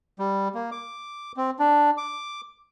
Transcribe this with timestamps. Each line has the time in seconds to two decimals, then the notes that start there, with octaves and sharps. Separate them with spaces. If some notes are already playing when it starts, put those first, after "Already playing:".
0.19 G3
0.55 A#3
0.72 D6
1.37 C4
1.59 D4
1.98 D6